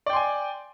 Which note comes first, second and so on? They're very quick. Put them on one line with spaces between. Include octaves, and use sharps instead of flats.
D5 G5 C6 G#5